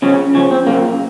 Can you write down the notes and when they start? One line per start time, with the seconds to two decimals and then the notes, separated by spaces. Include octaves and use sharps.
0.02 C#3 F3 C#4
0.35 C#3 F3 C#4
0.51 C4
0.67 C#3 F3 A#3